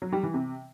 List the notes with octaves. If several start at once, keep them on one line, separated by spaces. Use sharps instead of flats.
F#3
G3
E3
C3